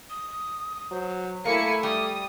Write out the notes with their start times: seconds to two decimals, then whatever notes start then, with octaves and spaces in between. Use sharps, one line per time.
0.10 D#6
0.91 F#3 C5
1.45 A3 A#3 E4 A4 G#5 C#7
1.83 G3 D6 D#6